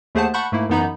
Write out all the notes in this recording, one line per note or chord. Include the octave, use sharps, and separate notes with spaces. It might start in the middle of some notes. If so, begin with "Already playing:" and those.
D#2 A3 G#4 C5 F#5 A5
F#5 A5 B5 C#6 F#6 G6
G#2 A3 A#3 E4
F#2 E3 B3 D#4 B5 G6